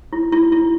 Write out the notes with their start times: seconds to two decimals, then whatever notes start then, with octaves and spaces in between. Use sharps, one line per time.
0.13 E4
0.32 E4
0.52 E4